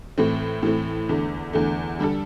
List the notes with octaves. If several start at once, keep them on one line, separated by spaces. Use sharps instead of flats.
A2 E3 A3 C4
A2 E3 A3 C4
E2 D3 A3
E2 D3 A3
D3 G3 D4 A4